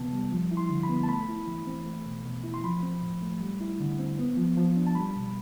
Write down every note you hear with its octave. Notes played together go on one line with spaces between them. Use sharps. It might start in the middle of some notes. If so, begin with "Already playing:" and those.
Already playing: C3 E3 B3 A5
G3
F3
E4
C6
D3
B5
B3
A5
A3 B5
E4
E3
C4
A3
B2
B2
E4
C6
F3 B5
C4
A2
A3
G3
E4
D3
C4
B3
F3
F3
D4
A5
G3 B5
B2